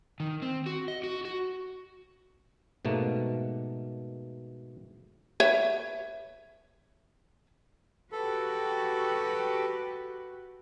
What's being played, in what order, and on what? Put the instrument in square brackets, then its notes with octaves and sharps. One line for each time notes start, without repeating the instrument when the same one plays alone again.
[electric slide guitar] D#3
C4
F#4
D#5
F#4
F#4
[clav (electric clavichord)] G#2 B2 A3 A#3
[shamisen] B4 C#5 E5
[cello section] F#4 G4 B4 [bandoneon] A4